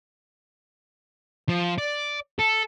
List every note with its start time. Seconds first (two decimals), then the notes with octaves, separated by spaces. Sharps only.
1.49 F3
1.78 D5
2.39 A4